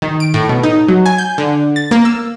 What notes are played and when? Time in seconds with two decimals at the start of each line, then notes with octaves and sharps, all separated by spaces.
0.02 D#3
0.20 D7
0.34 A2
0.49 B2
0.63 D#4
0.88 F#3
1.06 G#5
1.18 G6
1.38 D3
1.76 A6
1.91 A#3
2.05 E6